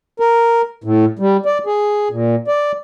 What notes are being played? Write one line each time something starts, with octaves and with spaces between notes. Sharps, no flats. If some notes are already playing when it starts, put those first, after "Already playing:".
A#4
A2
G3
D5
G#4
A#2
D5